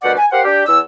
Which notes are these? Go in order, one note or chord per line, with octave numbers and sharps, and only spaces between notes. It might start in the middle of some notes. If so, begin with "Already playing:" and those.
D2 B2 D#3 G3 D5 F#5
G#5
G4 A#4 C5 F5 F#5
D4 G4
E2 E6